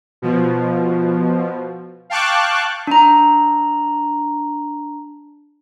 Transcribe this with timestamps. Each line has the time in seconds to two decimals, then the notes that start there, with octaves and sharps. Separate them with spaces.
0.22 B2 F3
2.10 F5 G5 A5 C#6 D6 F#6
2.87 D4 A#5